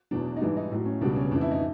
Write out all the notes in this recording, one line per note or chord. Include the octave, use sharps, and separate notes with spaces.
E2 B2 F#3 D4
D#4
G#2 E3 G3 D4
D#4
A2 F#3
C#4
C#2 B2 G3 D4
C#4
F2 C#3 E3 D4
E4
D#4